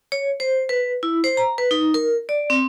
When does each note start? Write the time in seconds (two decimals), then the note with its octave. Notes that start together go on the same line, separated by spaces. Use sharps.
0.12 C#5
0.40 C5
0.69 B4
1.03 E4
1.24 C5
1.37 A#5
1.58 B4
1.71 D#4
1.94 A#4
2.29 D5
2.50 C4